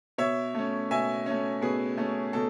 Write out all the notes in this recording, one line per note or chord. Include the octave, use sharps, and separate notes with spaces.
B2 C#5 E5
A3 C#4
B2 E5 G#5
A3 C#4
B2 G#4 B4
A3 C#4
B2 A4